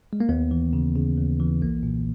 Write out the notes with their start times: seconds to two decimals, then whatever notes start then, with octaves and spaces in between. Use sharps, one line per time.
0.13 G#3
0.20 A#3
0.29 D#2 B3
0.51 E3
0.73 C#3
0.95 C#3
1.17 D#2
1.40 E3
1.62 B1 A#3
1.83 A#2